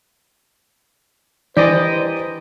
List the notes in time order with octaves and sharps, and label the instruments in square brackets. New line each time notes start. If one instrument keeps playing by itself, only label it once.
[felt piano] E3 [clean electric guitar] G4 A#4 D#5 [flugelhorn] C5 [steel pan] D5